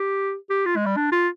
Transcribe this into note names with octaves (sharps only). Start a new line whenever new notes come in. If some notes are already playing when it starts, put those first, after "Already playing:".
Already playing: G4
G4
F4
G#3
G3
D4
F4